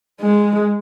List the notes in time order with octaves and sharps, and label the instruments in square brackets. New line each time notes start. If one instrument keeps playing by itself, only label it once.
[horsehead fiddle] G#3